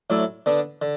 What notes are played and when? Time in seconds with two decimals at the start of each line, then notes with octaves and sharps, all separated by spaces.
0.10 A2 F#3 A3 E4 D5
0.46 D3 B3 D4
0.82 D3